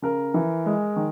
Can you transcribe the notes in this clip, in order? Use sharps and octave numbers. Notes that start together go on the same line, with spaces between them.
C#3 A#4
E3
G#3
D#3